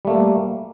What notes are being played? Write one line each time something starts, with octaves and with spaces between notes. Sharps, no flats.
G3 A3 A#3